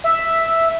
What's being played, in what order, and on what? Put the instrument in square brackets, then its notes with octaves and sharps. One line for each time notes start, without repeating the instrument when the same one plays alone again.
[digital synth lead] E5